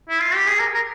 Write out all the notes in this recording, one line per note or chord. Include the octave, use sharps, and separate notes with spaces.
E4
F4
G4
G#4
A#4
A#4